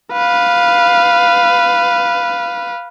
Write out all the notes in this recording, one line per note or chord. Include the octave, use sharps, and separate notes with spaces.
B4 F5